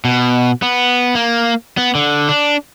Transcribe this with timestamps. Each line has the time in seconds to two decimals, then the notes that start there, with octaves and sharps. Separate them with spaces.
0.05 B2
0.62 B3
1.15 A#3
1.77 B3
1.95 D3
2.29 D4